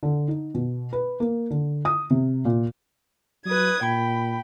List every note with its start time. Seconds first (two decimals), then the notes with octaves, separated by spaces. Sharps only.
0.03 D3
0.28 D#4
0.55 B2
0.93 B4
1.20 A#3
1.50 D3
1.85 D#6
2.10 C3
2.45 A#2
3.45 F#3 B4 D#6 G#6
3.82 A#2 G5 B5